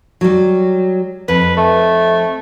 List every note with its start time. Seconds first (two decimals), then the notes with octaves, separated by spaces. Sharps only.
0.21 F#3 G3
1.28 F2 B4
1.57 A3